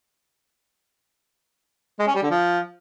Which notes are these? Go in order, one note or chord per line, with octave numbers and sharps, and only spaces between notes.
G#3
C#4
G3
D3
F3